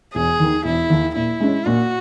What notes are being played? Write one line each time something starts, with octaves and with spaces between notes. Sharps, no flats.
E1 G#4
D#2 D#3
E1 E4
D#2 D#3
A#2 E4
G#3 C#4
A#2 F#4